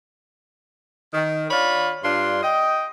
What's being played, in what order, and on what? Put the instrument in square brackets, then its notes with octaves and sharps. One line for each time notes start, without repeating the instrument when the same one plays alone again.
[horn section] D#3
D4 F4 C#5 B5
G2 D4 F4 C6
D#5 G5